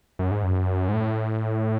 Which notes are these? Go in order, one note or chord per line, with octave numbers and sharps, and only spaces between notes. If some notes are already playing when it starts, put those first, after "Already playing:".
F#2
G#2
F#2
G#2
A2